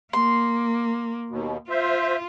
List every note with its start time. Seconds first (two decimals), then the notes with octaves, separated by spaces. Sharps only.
0.13 A#3 C6
1.30 D#2 B2
1.70 F4 C5 E5